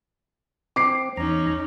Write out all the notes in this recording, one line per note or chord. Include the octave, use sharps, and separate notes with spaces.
C4 D6 C7
E2 C#4 D#4 A#5